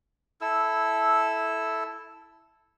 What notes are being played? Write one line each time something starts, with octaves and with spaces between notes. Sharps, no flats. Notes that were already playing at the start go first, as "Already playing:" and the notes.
E4 A4 E6